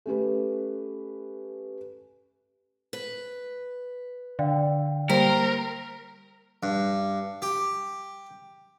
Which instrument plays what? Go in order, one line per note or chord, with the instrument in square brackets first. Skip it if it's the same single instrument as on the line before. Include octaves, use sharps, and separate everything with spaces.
[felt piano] A3 C#4 G4 B4
[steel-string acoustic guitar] B4
[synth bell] D3 [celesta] D5 F5 G5
[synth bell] G3 A#3 [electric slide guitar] A#4 [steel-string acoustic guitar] C5 [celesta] B6 D7
[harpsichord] G2
G4